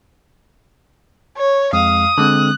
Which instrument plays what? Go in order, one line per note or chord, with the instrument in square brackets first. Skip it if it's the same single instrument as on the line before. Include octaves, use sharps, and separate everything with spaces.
[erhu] C#5
[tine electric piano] F2 G#3 [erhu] F5 [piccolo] D#6
[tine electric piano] D3 G#3 C4 [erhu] F#6